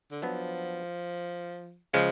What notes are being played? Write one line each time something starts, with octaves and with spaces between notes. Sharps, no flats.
D3
F3 F#3 B3 D4
C#3 F3 G#3